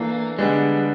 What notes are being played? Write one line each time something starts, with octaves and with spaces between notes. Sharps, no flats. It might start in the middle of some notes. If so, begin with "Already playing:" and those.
Already playing: E3 A3 A#3 D4
D3 G3 G#3 B3 D4